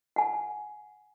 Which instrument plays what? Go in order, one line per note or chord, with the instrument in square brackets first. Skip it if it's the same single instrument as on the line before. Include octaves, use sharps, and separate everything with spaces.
[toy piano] F#5 G#5